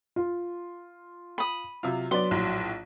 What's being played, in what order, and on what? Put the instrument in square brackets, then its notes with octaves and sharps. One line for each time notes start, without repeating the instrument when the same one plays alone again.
[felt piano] F4
[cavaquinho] B5 D#6
[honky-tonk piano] C3 F#3 F4
[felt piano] F#3 [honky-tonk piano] B3 D4 D5 [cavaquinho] C6
[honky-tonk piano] A#1 A2